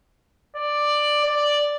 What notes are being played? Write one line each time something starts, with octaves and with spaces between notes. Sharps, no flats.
D5
D5